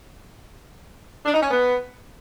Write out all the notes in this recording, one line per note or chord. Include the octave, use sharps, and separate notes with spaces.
D4
D#4
C#4
B3